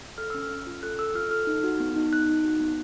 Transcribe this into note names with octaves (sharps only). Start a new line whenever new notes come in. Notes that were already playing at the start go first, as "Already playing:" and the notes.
A4 F6
C#4 E6
F6
C#4
F4
A4 F#6
A4 E6
F4 F6
A4 F6
D#4
F#4
B3
D#4
D#4 F#6
D#4
F#4
B3